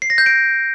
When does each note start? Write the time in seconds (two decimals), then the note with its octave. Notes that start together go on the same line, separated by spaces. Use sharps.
0.02 C7
0.10 A#6
0.18 G6
0.26 D7